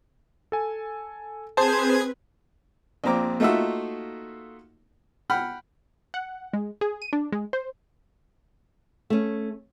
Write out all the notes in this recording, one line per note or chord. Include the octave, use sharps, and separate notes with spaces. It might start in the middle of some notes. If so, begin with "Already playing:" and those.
A4 G#5
C4 G#4 B4 C5 A5 G#6
A#1 A#2 C4 A#5 D6
A3 A#3 D#4 F4 F#4 E5
F#5 G5 B5 F6
F#5
G#3
G#4
D#7
D4
G#3
C5
A3 C#4